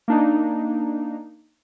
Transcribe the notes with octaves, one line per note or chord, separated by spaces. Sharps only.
A#3 D4 D#4